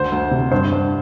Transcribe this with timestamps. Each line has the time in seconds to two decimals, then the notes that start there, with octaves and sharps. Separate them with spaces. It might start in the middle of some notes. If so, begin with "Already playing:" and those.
Already playing: D2 D3 C5
0.12 D2
0.31 C3
0.51 G2 C5
0.72 G2